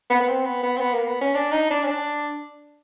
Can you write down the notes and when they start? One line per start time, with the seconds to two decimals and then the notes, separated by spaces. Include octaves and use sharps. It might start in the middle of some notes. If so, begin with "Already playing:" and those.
0.10 B3
0.21 B3
0.28 C4
0.45 B3
0.63 B3
0.77 C4
0.80 B3
0.94 A#3
1.07 B3
1.21 C#4
1.35 D4
1.52 D#4
1.70 D4
1.83 C#4
1.87 D4